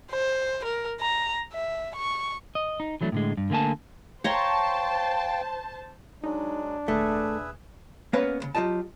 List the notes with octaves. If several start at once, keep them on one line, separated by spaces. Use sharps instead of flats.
C5
A#4
A#5
E5
C#6
D#5
D#4
E3 F#3 A3 C#4 D4
A2 D3 G#3
G2
D3 A3 A#3 G#5 A5
C5 C#5 F5 G5 A5 A#5 C6
F#3 G#3 D4 D#4
D#1 A3 G#4 B4 E5
A#3 B3 C#4 B4 C#5 F5
B1 C#3
F#3 F4 G4 D#5 A5